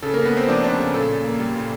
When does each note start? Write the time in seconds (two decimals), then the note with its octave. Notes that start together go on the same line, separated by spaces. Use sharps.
0.02 C#3 A4
0.14 C#3 A#3 A#4
0.25 B3 B4
0.33 A3 C4 C5
0.48 F3 D4 D5
0.63 C#3 D4 D5
0.79 C#3
0.94 A#2 A4
1.09 A#2
1.24 A#3
1.40 G3
1.55 A#2